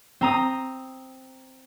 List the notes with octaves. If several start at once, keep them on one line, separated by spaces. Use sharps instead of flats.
C4 A#5 D#6